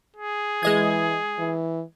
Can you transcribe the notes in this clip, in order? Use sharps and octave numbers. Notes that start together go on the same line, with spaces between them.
G#4
E3 G#3 D#5 G#6
E3